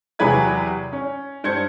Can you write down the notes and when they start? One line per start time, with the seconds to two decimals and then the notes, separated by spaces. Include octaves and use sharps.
0.19 E2 C3 F#3 G#4 B4 G#6
0.93 C#4
1.44 G2 C5 G6 G#6 C#7